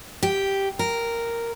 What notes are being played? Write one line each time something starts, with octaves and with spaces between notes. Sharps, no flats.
G4
A#4